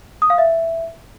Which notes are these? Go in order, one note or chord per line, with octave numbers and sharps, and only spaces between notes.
D#6
F5
E5